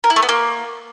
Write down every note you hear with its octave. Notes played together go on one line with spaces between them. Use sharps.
A#4
E4
A3
B3
A#3